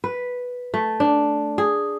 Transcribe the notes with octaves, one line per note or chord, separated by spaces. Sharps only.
B4
A3
D4
G#4